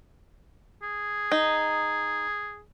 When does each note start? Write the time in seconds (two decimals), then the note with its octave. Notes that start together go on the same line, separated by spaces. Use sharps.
0.82 G#4
1.32 D#4